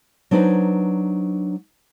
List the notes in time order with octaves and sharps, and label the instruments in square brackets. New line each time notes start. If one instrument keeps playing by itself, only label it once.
[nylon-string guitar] F#3 D4 D#4 B4 C5